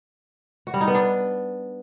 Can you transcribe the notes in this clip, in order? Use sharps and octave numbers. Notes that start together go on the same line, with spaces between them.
F#4
G3
D#4
B3
D4